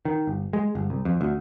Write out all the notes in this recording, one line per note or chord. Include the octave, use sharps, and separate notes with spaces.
D#3
G1
G#3
G1
C2
F2
D2